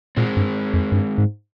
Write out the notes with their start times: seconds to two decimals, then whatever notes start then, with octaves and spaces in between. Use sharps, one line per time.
0.17 A#2 G#3 C4
0.37 G2
0.73 F2
0.92 G2
1.18 G#2